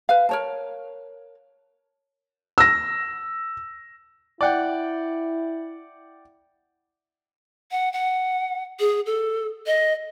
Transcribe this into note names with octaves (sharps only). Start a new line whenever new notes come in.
B4 F5
A#4 C#5 A5
E6 A#6
E4 D5 F#5 G5
F#5
F#5
G#4
A4
D#5